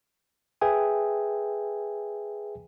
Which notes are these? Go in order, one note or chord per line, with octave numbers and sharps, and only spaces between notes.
G#4 B4 E5 G5 G#5